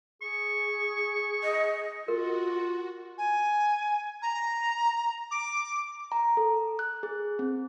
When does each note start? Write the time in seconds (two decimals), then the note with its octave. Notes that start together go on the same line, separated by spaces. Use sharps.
0.22 G#4 C#6
1.43 D#5
2.08 F4 F#4 A#4
3.18 G#5
4.22 A#5
5.31 D6
6.12 A#5
6.37 A4
6.79 F#6
7.03 G#4
7.39 C4